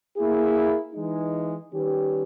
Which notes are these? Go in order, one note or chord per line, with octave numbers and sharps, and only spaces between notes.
A#3 E4 G#4
E3 G#3 D#4
D#3 G3 C#4 G4 B4